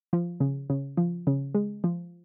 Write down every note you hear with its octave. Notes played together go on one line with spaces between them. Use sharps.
F3
C#3
C#3
F3
C#3
G#3
F3